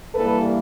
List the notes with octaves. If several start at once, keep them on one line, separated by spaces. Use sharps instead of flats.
G2 E3 G3 A#3 A4 B4